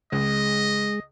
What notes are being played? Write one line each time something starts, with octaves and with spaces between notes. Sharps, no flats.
C#2 G#3 D#5